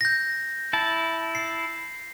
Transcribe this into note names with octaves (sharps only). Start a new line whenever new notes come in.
G6 A#6
E4 A5
C7